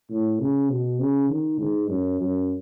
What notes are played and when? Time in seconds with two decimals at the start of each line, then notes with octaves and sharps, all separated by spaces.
0.10 A2
0.40 C#3
0.70 B2
0.99 C#3
1.29 D#3
1.60 G#2
1.89 F#2
2.20 F#2